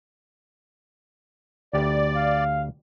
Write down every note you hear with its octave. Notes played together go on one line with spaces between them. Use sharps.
D2 G4 D5
F5